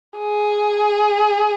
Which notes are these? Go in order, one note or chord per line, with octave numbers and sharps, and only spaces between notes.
G#4